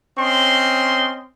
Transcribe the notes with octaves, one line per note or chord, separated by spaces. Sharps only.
C4 C#4 D#5 C6